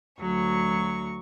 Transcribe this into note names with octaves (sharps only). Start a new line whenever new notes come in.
D2 F#3 C#6